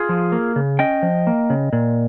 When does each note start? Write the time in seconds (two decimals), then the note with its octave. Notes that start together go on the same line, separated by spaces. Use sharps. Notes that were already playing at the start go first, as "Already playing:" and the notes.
Already playing: F4 G#4
0.09 F3
0.32 A#3
0.56 C#3
0.79 C#4 D#5 G5
1.03 F3
1.27 A#3
1.50 C#3
1.73 A#2